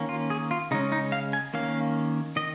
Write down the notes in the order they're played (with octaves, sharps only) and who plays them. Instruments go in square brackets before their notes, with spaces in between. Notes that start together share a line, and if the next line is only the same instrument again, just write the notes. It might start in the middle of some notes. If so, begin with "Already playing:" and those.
Already playing: [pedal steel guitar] D#3 A#3 C#4
F4
G#4
F4
C#3 G#3 C#4 D#4
D#4
F5
G#5
D#3 A#3 C#4 F5
D#3 D#5